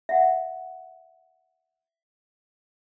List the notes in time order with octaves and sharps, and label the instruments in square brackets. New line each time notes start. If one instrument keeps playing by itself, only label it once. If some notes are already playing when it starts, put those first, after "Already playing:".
[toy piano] E5 F#5